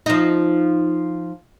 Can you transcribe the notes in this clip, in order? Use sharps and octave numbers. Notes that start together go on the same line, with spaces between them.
F3 D#4